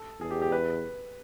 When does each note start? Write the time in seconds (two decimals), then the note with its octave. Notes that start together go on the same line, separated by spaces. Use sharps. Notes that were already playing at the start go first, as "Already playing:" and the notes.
Already playing: A4
0.20 E2 G#4
0.31 G4
0.42 G4
0.52 B4